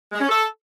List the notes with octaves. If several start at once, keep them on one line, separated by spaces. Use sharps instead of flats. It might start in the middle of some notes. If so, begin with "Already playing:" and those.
G#3
C#4
A4